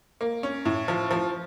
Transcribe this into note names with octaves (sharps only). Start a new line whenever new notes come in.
A#3
C#4
A2
F3
F3